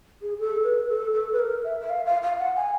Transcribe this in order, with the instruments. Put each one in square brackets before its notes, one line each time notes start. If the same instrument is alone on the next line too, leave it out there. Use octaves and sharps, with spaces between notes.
[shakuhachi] G#4
A4
B4
A4
A4
B4
A#4
E5
E5
F5
F5
F5
F#5
G#5